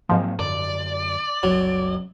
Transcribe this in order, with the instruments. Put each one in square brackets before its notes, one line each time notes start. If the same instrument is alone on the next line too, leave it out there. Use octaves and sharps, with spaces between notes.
[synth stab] G#2 F3 [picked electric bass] F#3 A#3 C4
[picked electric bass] F#2 D3 [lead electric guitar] D5
[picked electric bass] F#1 C2 F#2 [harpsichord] F#3